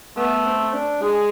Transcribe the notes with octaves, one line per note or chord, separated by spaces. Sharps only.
A3 B3
C4
D4
G#3 G#4